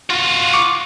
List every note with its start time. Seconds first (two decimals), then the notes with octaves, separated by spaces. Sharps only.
0.10 F4 F#4
0.53 C#6 D6